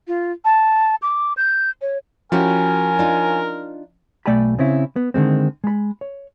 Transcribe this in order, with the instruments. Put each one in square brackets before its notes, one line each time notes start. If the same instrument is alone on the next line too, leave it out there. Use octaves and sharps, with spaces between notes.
[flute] F4
A5
D6
G6
C#5
[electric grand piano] F3 C#4 [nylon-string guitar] E4 F#4 G4 [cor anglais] A#4 [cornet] G#5
[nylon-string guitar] D4 D#4 F4
[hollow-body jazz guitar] B1 A3 D5 G5 G#5 B5
C#3 C4 C#4 E4
B3
D3 D#3 G#3 C4
G#3 B5
C#5